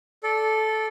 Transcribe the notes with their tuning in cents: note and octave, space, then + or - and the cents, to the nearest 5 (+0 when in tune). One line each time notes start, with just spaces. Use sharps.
A4 -10 D5 +0